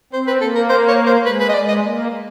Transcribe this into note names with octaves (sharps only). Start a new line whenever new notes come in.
C4 C5
B4
A#3 A4
A#4
C5
C#5
C5
G#3 B4
B4
D#5
G#3 D5
D#5
A#3